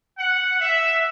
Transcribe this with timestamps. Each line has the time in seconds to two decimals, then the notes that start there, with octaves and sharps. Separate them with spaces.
0.18 F#5
0.61 E5